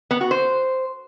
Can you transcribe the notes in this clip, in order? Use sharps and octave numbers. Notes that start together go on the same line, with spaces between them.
B3
F#4
C5